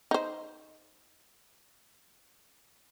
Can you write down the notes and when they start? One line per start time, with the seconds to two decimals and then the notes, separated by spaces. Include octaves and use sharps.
0.11 D#4 C5